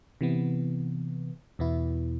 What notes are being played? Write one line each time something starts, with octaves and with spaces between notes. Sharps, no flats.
C3 E3 B3
E2 B2 B3 E4